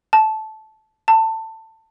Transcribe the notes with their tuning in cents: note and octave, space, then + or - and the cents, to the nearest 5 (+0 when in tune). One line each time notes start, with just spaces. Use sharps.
A5 -15
A5 +20